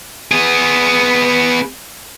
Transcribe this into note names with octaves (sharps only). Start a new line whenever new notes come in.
B3 G#4